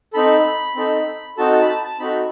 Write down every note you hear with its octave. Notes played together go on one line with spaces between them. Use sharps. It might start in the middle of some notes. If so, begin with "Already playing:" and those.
C4 D#4 A4 B5
C4 D#4 A4
C4 D#4 F#4 A4 A5
A5
B5
A5
A5
C4 D#4 F#4 A4 B5